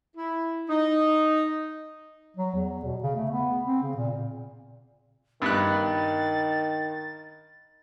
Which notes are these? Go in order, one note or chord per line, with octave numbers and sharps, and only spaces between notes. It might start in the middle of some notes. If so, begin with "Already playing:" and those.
E4
D#4
F#3
E2
B2
C#3
A3
B3
C4
C#3
A#2
G2 D#3 B3 F#6 A6